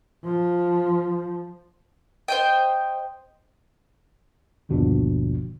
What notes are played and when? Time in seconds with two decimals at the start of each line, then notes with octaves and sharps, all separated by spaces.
0.25 F3
2.28 C5 D#5 G5
4.69 G1 D#2 B2 F3 D4